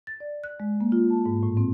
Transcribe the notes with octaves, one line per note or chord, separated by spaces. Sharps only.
A6
D5
F#6
G#3
A#3
F4
A5
G#2
A2
C4